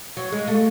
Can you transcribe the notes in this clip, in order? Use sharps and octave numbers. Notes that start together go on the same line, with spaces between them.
F#3
G#3
A3